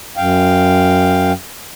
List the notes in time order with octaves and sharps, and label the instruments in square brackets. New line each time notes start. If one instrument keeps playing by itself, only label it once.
[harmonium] F#2 F5 G5